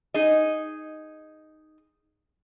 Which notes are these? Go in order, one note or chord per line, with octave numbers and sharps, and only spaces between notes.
D#4 G#4 D#5